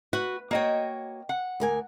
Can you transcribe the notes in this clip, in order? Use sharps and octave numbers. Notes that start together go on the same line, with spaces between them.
F#4 B4
A#3 F#4 C#5 D#5 G5
F#5
D2 A#4 G#5